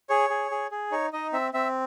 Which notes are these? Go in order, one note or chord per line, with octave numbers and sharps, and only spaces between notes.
G#4 C#5
G#4
G#4
G#4
D#4 C#5
D#4 D#5
C4 E5
C4 E5